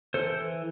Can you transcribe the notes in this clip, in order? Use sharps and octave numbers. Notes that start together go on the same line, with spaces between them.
E3 A4 C5